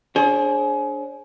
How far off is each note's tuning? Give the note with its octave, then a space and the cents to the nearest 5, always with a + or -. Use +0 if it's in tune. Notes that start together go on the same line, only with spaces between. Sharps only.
D4 -10 G#4 +30 C5 +45